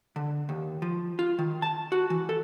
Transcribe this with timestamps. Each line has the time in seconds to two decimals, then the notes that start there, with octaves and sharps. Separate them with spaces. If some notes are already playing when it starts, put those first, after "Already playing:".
0.16 D3
0.49 D#2
0.82 F3
1.19 F4
1.39 D#3
1.62 A5
1.92 F#4
2.10 E3
2.29 A4